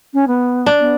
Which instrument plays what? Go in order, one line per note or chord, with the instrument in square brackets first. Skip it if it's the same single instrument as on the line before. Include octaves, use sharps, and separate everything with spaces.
[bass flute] C#4
B3
[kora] D4
[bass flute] B3